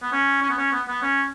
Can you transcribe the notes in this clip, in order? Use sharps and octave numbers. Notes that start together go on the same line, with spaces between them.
B3
C#4
C#4
B3
C#4
B3
B3
C#4